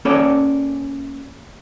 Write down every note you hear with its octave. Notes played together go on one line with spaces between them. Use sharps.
A#3 C#4 A4 C#5 D5